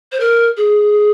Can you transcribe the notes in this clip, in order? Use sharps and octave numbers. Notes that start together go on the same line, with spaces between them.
C5
A#4
G#4